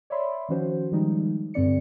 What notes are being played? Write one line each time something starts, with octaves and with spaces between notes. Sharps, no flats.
C#5 D5 E5 B5 C6
D#3 F3 C#4 F#4 C5
D#3 F3 G3 G#3 D#4
G2 D3 C4 D5 C#7